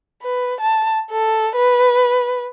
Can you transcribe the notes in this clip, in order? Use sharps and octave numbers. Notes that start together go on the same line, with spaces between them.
B4
A5
A4
B4